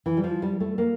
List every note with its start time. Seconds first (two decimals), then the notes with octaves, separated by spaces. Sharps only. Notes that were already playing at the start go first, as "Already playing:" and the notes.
0.06 E3
0.17 G3
0.24 F3
0.42 G3
0.60 A3
0.78 A#3